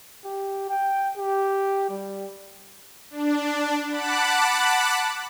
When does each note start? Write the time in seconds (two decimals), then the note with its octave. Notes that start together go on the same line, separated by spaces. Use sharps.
0.25 G4
0.69 G5
1.17 G4
1.89 G3
3.10 D4
3.87 F#5 A5 B5 D6 F#6